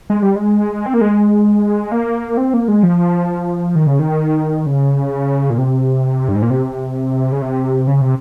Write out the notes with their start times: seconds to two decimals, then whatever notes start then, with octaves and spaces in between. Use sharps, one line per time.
0.10 G#3
0.22 G3
0.36 G#3
0.86 C4
0.94 A#3
1.01 G#3
1.92 A#3
2.37 C4
2.54 A#3
2.68 G#3
2.83 F3
3.75 D#3
3.87 C#3
3.99 D#3
4.66 C#3
5.50 A#2
5.58 C3
6.28 G2
6.35 G#2
6.42 A#2
6.50 C3
7.32 C#3
7.42 C3
7.87 C#3
8.01 C3